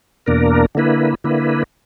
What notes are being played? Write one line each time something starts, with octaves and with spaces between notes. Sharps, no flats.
E2 B2 A#3 D4 A#4
D3 A#3 E4 B4
D3 A#3 E4 B4